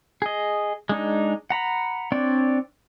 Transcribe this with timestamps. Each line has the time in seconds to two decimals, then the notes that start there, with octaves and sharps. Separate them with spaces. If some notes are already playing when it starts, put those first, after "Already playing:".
0.22 G#4 D#5
0.89 G#3 D4 D#4
1.50 F#5 A#5 B5
2.12 C4 D4 C#5 D5